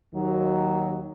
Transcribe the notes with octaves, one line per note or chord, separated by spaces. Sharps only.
D#2 D#3 F#3